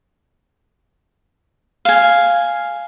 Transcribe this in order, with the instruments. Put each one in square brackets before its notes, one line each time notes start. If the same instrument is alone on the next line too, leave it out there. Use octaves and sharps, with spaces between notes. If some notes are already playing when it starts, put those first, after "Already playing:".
[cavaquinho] F5 G#5